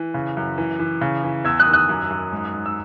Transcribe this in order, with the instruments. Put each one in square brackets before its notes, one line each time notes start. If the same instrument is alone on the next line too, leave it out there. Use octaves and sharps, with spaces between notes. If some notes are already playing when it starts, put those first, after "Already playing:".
Already playing: [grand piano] E3
C#3
F#2
E3
E3
C#3
E3
E2 E6 G#6
D#6 F#6
D#3
D#6 F#6
F#2
F#2
G#2
G#2
E6